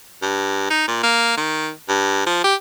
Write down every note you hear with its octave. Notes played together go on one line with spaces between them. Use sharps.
G2
D#4
A#2
A#3
D#3
G2
F3
G4